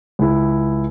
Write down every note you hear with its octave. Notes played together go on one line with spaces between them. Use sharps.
C#2 E4